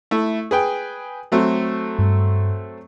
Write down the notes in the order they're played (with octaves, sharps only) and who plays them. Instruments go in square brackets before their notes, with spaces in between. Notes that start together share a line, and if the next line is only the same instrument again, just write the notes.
[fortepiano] A3 E4
G#4 B4 G5
F#3 A3 C4
[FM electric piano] G2